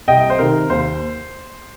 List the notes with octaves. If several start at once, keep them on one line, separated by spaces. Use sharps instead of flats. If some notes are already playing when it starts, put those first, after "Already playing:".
C2 D#5 G5
C5
C3 D#3 A#4
D#2 C5